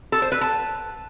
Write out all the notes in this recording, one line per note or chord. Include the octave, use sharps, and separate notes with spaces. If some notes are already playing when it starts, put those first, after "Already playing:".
A4
C5
B4
A5